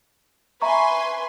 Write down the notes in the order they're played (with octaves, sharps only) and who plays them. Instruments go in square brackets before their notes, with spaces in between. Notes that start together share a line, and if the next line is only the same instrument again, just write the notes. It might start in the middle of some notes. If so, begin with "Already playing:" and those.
[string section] B4 G#5 C6 [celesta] E5 A#5 C#6